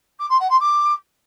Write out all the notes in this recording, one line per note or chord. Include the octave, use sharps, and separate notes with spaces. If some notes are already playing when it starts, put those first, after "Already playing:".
D6
C6
F#5
C6
D6